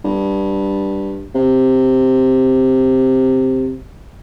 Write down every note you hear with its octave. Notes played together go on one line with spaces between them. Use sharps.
G2
C3